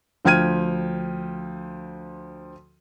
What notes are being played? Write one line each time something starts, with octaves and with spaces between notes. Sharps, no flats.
D2 F3 G5 F6 G#6 D#7